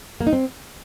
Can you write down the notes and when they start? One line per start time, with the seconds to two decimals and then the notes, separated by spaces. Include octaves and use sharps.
0.21 A#3
0.27 D#4
0.33 C4